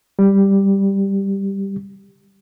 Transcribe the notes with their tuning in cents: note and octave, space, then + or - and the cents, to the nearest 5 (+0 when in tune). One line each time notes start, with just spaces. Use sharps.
G3 +0 G4 +0